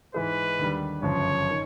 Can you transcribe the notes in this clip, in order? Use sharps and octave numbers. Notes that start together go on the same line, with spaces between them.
G#2 E3 G#3 B4
D#2 D3 G3
G1 F#2 C#3 F3 C#5
D#3